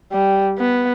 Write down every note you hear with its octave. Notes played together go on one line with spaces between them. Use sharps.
G3
B3